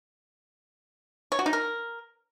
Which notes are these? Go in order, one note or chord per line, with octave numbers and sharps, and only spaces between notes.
C#5
F#4
D#4
A#4